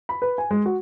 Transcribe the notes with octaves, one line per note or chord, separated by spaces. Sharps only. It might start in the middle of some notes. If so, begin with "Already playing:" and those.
B5
B4
G#5
G#3
F#4